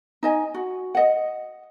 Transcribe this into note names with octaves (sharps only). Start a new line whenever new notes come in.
D#4 D#5 G#5
F#4
D#5 F#5